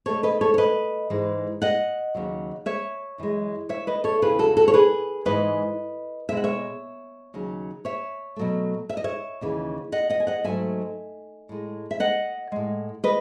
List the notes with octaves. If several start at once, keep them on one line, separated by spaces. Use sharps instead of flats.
B2 A3 A4 C#5
B4 D#5
A4 C#5
C#5
B4 D#5
G#2 E3 G#3
D#5 F#5
D#2 C#3 F#3
C#5 E5
F#2 E3 G#3
C#5 E5
B4 D#5
A4 C#5
E2 C#3 E3 G#4 B4
F#4 A4
F#4 A4
C#5
G#4 B4
G#2 E3 G#3 B4 D#5
B2 G#3 E5
F#5
C#5 E5
D#2 C#3 F#3
C#5 E5
B2 F#3 A3
E5
D#5
C#5 E5
D#2 C#3 E3
D#5 F#5
D#5 F#5
G#5
D#5 F#5
G#2 F#3 A3 E5 G#5
A2 G#3
E5
D#5 F#5
A2 G#3
B4 D#5